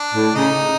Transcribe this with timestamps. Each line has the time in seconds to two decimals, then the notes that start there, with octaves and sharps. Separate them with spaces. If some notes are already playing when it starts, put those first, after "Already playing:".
Already playing: D4
0.14 A2
0.35 C#3 D#4